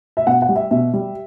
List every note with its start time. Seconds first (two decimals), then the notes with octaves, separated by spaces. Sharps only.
0.17 E5
0.27 B2 F#5
0.42 F#5
0.49 G3
0.56 E5
0.71 B2 E5
0.93 G3